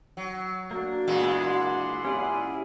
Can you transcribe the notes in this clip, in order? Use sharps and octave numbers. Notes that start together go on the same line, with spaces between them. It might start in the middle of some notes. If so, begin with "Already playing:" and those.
F#3
A#3 D4 F#4
A#2 E3 G#3 B3
D5 F#5 C6
C#4 E4 G4 G#4